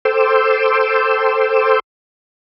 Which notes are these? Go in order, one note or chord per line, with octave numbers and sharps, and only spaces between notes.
A4 C5 G5 C6 D6 E6